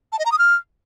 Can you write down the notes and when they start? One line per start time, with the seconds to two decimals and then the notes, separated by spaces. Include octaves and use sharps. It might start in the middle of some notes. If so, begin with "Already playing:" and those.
0.12 A5
0.19 D#5
0.25 A#5
0.32 D#6
0.38 F6